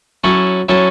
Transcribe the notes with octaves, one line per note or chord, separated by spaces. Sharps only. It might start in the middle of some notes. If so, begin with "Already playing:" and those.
F#3 C#4 E4 A4
F#3 C#4 E4 A4